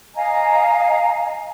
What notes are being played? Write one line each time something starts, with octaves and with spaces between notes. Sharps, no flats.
D#5 F5 G#5 A#5